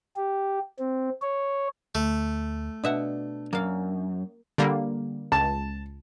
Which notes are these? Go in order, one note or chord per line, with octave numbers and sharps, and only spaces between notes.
G4
C4
C#5
D2 A3
B2 D4 E5 F#5
F#2 A#3 F5
D3 G3 A#3
C#2 A5